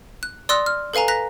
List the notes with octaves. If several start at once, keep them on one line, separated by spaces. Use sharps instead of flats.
F#6
D5 C6 D#6 E6 F#6 A#6
F6
A4 B4 F5 G#5 A#5
A#5 F#6 A#6 B6